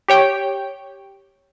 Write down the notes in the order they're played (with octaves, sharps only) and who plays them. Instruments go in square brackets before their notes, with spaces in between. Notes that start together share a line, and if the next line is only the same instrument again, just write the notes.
[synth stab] G4 C#5 G5